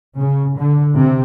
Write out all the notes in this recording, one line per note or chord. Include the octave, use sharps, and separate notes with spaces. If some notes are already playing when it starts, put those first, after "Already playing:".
C#3
D3
C3